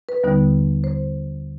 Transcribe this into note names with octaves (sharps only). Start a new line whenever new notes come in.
B4
D#2 D3 G3 B3 D#4
C5